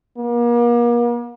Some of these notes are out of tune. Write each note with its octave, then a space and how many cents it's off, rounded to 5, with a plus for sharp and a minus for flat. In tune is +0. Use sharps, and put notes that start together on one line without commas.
A#3 +40